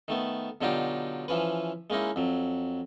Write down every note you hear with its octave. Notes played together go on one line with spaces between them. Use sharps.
D#3 A3 B3
B2 D3 F#3 D#4 F4 G4
E3 F3 C#4 B4
G#3 A#3 C#4 D#4 E4
F2 F#3